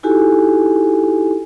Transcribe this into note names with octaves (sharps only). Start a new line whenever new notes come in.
D#4 E4 F#4 G4 A4 G#5